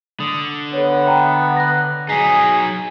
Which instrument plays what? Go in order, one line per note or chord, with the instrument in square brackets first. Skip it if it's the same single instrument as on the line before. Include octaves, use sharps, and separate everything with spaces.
[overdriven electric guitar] D3 [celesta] D#6
[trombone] B3 [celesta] A4 C#5
[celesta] E5 G5 A#5
F#6 A#6
[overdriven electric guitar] F#3 D#4 [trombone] G#4 [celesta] B6 C7